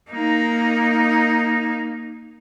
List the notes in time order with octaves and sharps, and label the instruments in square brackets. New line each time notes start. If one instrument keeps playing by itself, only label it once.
[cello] A#3 D#4